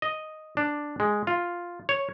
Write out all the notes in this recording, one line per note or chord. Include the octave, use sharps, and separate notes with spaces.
D#5
D4
G#3
F4
C#5